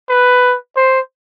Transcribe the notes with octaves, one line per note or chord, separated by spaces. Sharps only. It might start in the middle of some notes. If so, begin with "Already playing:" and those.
B4
C5